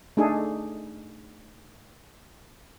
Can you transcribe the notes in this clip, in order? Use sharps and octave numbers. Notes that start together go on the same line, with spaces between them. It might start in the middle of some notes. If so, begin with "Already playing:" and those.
A3 D4 D#4 G#4 A4